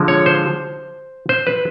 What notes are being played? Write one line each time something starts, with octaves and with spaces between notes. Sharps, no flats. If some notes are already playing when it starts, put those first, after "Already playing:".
Already playing: D3 F3 G#3
C#5
C5
C5
B4